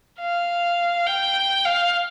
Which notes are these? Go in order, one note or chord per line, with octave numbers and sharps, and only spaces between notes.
F5
G5
F5